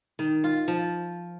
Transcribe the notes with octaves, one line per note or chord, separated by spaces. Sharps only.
D#3
F4
F3